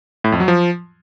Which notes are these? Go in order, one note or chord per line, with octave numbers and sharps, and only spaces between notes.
A2
F2
F#3
F3